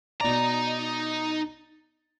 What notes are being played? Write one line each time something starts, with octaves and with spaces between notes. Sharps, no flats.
B2 D#4 D5 A#5